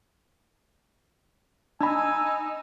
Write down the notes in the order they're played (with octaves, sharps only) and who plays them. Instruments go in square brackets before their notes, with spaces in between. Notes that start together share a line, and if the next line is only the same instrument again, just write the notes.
[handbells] D4 B5 [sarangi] D#4 [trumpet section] G#5 [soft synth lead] E6